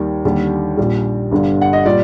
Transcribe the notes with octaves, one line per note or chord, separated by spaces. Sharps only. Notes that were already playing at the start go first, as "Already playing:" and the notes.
Already playing: D#2 D#3 G3
D#2 D3 G3
A#1 A#2 G3
G1 G2 D3 G3
F#5
D#5
A#2 G3 D5